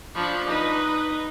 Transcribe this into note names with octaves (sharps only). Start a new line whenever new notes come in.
F3 D4 B5 C#6
D#4 B4 D#5